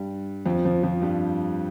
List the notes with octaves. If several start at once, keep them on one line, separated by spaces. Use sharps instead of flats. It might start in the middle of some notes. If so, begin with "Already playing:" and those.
Already playing: G2 G3
F2 F3
F2 F3
F2 F3
G2 G3